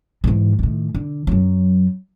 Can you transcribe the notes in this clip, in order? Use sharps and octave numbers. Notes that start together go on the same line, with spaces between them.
G#2 E3
A2 D#3
D3
F#2 F#3